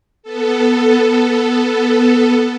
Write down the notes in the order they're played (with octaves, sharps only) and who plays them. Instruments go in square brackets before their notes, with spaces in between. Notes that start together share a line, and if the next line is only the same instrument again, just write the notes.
[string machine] B3 A4